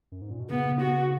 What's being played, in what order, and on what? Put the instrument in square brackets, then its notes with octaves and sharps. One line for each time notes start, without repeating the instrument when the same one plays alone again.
[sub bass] F#2
G#2
A#2
B2
[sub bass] C#3 [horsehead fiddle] B3
[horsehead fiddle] F#4